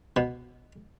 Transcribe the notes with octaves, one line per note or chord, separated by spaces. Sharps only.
B2